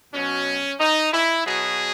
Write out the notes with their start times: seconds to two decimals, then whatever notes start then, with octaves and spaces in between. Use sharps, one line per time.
0.13 B2 F#3 C#4
0.79 D#4
1.13 E4
1.46 B2 F#3 G#4